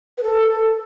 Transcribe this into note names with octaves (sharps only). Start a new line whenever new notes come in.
B4
A4